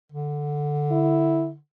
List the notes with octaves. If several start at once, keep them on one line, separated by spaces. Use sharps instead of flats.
D3
E4